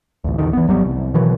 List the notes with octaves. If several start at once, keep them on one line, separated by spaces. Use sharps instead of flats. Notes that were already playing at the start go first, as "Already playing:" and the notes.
A1 D2
A#1 E2 D3 D#3
E3 B3
G#1 F#3 G3 B3
C2
B2 D#3 E3 F#3